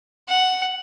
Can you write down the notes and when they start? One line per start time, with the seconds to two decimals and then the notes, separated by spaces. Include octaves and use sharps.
0.29 F#5